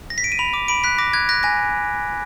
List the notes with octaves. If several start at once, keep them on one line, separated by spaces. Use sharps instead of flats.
A#6
B6
D7
D#7
B5 F7
D6
B5 D7
F#6 B6
D6 A#6
F#6 G#6
F#6 A#6
G#5 A#6